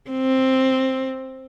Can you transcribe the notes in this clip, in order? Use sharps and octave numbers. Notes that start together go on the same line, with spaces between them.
C4